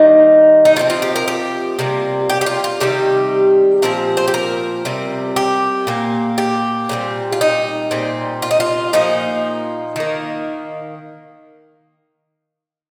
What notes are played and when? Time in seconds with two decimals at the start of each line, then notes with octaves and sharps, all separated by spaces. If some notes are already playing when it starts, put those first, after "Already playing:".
Already playing: D#3 G3 A#3 D#4
0.65 D#4
0.76 C3 F4
0.79 F3 C4
0.90 F4
1.02 G4
1.16 A#4
1.28 G4
1.79 C3 G3 A#3
2.30 G4
2.41 G4
2.46 F4
2.64 F4
2.80 C3 D#3 G3 G4
3.82 A#2 F3 C4 A#4
4.17 C5
4.28 G4
4.34 A#4
4.85 C3 G3 C4
5.36 G4
5.87 A#2 A#3
6.38 G4
6.89 A#2 G3 C4
7.32 F4
7.41 D#4
7.91 A#2 G3 C4
8.42 F4
8.51 D#4
8.60 F4
8.93 A#2 F3 A#3 D#4
9.96 D#3 A#3